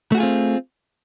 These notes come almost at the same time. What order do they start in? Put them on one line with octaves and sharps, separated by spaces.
A3 F#4 G#4 F4 C4